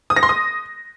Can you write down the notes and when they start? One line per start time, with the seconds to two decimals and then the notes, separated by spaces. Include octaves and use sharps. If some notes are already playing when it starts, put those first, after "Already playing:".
0.10 D#6
0.16 A#6
0.23 C6
0.29 D#6